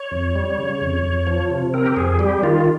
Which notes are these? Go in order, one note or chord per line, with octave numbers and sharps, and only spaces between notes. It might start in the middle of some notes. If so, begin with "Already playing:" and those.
Already playing: C#5
F2
G3
C#3
F2
F2
F3
C3
C4 A#4
G4
F2 G#4
G3 G4
D#3 F4